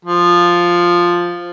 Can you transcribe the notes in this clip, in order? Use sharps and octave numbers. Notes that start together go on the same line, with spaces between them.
F3